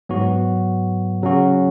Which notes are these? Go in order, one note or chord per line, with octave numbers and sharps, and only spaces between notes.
G#2 F#3 B3 F#4
C#3 F#3 C#4 F#4